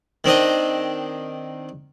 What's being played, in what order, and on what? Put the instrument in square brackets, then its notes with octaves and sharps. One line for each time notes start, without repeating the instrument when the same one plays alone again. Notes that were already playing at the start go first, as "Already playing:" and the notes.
[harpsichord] D#3 C4 D4 D#5